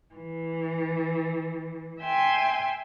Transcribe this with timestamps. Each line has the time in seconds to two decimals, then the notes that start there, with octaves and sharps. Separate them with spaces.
0.14 E3
2.01 E5 G5 G#5 C6